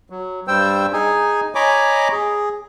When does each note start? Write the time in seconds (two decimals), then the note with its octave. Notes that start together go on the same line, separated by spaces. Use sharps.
0.10 F#3
0.48 G2 G3 C5 G5 E6
0.93 D#4 G#4 G#5
1.55 C#5 D#5 G#5 A#5 B5 D6
2.12 G#4